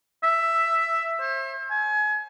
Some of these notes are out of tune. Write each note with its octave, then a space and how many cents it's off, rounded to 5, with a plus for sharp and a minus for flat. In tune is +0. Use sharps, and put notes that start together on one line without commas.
E5 +10
C5 +40
G#5 +30